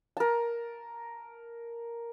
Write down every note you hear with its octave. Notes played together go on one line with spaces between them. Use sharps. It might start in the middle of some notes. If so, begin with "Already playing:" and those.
A#4 A5